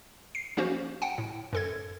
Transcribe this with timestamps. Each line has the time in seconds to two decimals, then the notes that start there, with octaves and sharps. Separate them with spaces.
0.35 C7
0.57 F3 A#3 C#4 F#4 C5
1.02 F#5 G5
1.18 A2
1.53 F#2 A4 G#6